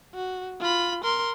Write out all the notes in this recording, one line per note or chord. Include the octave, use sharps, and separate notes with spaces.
F#4
F4 B5
A#4 C6